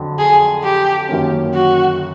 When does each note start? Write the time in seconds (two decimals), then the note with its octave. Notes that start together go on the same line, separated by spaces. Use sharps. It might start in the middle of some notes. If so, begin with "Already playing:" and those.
Already playing: F2 D3 F#3
0.19 G#4
0.64 G4
1.09 F#2 D#3 F#3 A#3 C#4
1.55 F#4